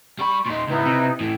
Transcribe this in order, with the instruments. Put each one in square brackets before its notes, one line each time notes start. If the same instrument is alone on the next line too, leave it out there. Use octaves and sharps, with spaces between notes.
[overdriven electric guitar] G3 B5 [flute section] C#6
[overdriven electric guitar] A#2 D#4 [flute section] C6
[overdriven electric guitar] C#2 B3 [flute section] D#4 E4 B4
[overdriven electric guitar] C3
A2 E3